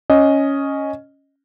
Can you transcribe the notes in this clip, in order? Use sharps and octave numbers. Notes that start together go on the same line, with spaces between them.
C#4 D#5